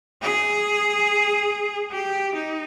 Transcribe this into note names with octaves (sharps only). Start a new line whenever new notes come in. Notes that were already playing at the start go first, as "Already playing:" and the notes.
G#4
G4
D#4